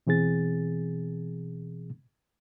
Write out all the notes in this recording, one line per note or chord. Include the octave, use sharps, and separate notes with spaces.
B2 E3 C4 G#4 A6